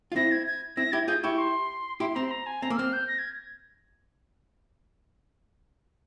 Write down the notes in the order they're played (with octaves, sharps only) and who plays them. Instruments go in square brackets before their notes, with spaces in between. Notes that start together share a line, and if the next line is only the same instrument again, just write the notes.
[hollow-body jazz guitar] F4
[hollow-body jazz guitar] C4 E4 [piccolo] A#6
[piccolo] G#6
G#6
[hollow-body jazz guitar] C4 E4 [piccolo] A#6
[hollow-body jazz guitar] E4 G4 [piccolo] G#6
[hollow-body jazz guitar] F4 G#4 [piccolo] G6
[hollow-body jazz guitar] E4 G4 [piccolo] C#6
[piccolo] C6
[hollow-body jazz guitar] E4 G4 [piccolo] C6
[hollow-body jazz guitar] C4 [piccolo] A#5
[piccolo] C6
A#5
G#5
[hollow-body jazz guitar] C4 [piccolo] A#5
[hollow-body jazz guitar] A#3 [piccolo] E6
[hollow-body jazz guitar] C4 [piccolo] F6
[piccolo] G6
A#6
G#6